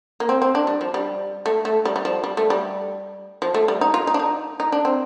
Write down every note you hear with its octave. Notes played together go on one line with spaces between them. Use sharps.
A#3
C4
C4
D4
G3
F3
G3
A3
A3
G3
G3
F3
G3
A3
G3
F3
A3
G3
D#4
F4
D#4
D4
D#4
D#4
D4
C4